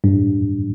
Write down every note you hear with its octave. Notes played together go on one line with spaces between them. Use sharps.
G2